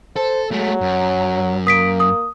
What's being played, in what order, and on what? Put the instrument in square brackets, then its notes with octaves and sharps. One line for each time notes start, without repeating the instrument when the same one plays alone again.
[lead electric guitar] A4 [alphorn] C5
[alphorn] F#3 [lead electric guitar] G#3 A3
[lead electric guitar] F#2
[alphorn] A#3 [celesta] D#6 B6 D7
[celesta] D#6